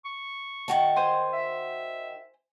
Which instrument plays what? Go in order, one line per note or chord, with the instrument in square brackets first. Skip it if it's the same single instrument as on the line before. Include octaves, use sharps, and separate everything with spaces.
[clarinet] C#6
[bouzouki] D#3 F#4 A5
[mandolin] C5 G#5 C6
[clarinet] E5